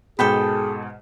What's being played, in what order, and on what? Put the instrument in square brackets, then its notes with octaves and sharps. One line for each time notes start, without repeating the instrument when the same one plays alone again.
[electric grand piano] G#2 B2 [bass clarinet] G#4 [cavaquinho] A4 G5 B5